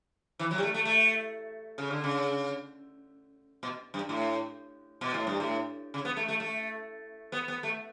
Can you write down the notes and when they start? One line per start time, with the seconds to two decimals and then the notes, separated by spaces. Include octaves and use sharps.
0.39 E3
0.51 F#3
0.58 G3
0.63 A3
0.74 A3
0.85 A3
1.78 C#3
1.91 D3
2.04 C#3
3.63 B2
3.94 G2
4.09 A2
5.01 B2
5.14 A2
5.27 G2
5.40 A2
5.94 C#3
6.05 B3
6.17 A3
6.28 A3
6.40 A3
7.32 B3
7.48 B3
7.63 A3